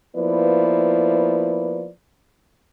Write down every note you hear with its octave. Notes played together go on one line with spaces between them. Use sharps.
F3 A#3 B3 E4 B4 D5